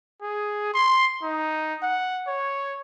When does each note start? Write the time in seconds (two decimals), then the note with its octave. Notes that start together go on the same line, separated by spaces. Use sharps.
0.22 G#4
0.74 C6
1.23 D#4
1.82 F#5
2.27 C#5